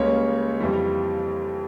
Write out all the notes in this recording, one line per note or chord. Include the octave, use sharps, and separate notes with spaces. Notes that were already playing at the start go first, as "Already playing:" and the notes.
Already playing: C#2 C#3 G3 A#3 C#4 C#5
F2 E3 G3